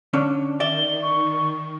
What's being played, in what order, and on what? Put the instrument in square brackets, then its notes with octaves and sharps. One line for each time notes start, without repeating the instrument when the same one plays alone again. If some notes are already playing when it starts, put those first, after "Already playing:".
[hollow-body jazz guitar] D3 C#4 D4
[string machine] D#3 [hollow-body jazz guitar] D5 E5 [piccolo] G7
[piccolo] C#6